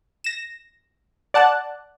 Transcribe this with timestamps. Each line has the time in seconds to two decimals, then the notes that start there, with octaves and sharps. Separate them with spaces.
0.24 A#6 E7
1.34 D5 F#5 A5 F#6